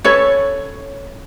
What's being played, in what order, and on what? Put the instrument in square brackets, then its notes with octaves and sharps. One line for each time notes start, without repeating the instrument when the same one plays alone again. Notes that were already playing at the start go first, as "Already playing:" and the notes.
[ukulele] C#4 A4 B4 C#5